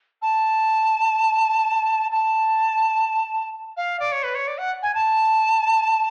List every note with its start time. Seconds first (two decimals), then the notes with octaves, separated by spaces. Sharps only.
0.22 A5
2.12 A5
3.77 F5
4.00 D5
4.12 C#5
4.23 B4
4.35 C#5
4.47 D5
4.58 F#5
4.82 G#5
4.94 A5